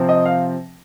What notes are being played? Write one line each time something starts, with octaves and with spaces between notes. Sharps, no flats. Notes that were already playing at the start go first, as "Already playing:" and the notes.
Already playing: C3 F3 C4
D#5
F5